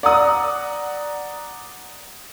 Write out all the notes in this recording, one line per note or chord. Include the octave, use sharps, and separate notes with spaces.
D5 F#5 A#5 D#6